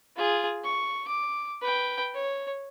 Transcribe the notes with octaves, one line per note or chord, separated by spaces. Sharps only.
F4 G#4
C#6
D6
B4 G5
C#5